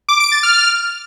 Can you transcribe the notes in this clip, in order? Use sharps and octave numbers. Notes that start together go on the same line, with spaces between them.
D6
D7
A6
F6